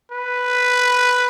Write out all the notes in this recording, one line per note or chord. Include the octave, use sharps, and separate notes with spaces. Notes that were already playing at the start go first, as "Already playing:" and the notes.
B4